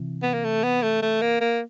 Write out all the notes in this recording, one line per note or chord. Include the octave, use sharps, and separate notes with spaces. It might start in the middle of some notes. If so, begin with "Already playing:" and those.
Already playing: C3 E3
B3
A#3
A3
B3
A3
A3
A#3
A#3